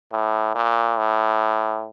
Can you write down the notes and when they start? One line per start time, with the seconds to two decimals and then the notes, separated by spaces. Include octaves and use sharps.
0.12 A2
0.55 A#2
0.98 A2